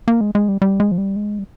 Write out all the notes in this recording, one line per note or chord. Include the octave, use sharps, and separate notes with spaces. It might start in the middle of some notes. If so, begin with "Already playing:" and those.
A#3
G#3
G#3
G3
G3
G#3
F3
G3
G#3
G3